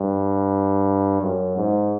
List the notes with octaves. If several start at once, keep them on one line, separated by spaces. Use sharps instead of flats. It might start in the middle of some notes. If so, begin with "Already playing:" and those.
Already playing: G2
F#2
G#2